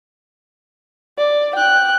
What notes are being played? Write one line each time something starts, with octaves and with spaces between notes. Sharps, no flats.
D5
G5 F#6